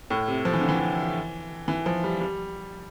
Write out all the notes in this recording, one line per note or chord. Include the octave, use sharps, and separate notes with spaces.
A2
C3
F3
E3
D3
E3
E3
F3
G3
G3